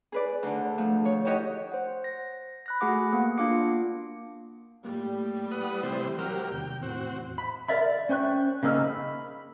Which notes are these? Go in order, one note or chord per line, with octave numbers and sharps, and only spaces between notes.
G#4 B4 D5
D2 D3
F3 A3
F3 C#5
E4 F#4 G4 C#5 D#5
C5 F#5
A#6
B5 F#6 A#6
A3 F#4 G#4 F#5 B5 D6
A#3 B3 F#5
A#3 D4 F4 F5 D6 C#7
A2 G3 A#3
B4 F#5 D#6
C3 E3 C5
F#3 G4 A#4 E6 F6
E2 C3 D#3 G5
E2 A2 C4 F#4
B5
A#4 D5 E5 B5
D5
C#4 C5 G5 C#6 F#6
C#3 A#3 D#4 E6 F6
B5